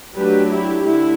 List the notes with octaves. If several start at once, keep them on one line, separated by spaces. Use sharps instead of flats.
F#3 A3 D4 G4 B4
E4 G4
D3 A3 E4